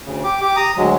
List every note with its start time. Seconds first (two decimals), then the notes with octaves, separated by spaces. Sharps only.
0.05 D2 C#3
0.24 G4 D6
0.41 G4 D6
0.56 A#5 D#6
0.77 D2 F#3 G#3